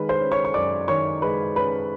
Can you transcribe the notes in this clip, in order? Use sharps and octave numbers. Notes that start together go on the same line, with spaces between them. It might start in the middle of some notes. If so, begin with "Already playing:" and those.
Already playing: D#3 G#3 B4 B5
C5 C6
C#4
C#5 C#6
C#6
F#2 D5 D6
D#3 C#5 C#6
G#3 B4 B5
C#4 B4 B5